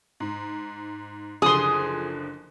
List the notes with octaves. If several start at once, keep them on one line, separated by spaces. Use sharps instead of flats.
G#2
F#1 D3 F3 G#4 C6 D#6